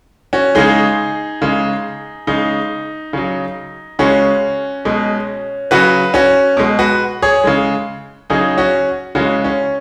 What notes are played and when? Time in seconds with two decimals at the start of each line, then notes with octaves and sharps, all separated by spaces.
0.33 C#4 F#4
0.55 C#3 G#3 D#4 G#4
1.42 C#3 G#3
2.27 C#3 G#3 D#4
3.13 C#3 F#3
3.99 C#3 G#3 C#4 F#4
4.85 B2 G#3
5.71 C#3 F#3 F#4 B4
6.14 C#4 F#4
6.57 B2 G#3
6.79 F#4 B4
7.22 G#4 C#5
7.44 C#3 G#3
8.30 C#3 F#3 D#4 G#4
8.58 C#4 F#4
9.15 C#3 G#3 C#4 F#4
9.44 C#4